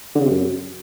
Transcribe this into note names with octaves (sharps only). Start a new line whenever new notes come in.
D3
C#3
C3
F#2